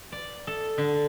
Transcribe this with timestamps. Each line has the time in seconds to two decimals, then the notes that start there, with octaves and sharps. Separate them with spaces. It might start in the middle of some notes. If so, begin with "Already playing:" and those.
0.12 D5
0.47 A4
0.78 D3